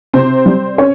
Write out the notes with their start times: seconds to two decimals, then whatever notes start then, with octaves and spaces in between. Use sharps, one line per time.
0.13 C3 C4 C5
0.46 G3
0.78 C#4 C#5